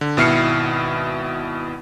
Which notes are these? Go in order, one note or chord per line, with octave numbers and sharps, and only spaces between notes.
D3
G#1 B2 E4 F6 C7 C#7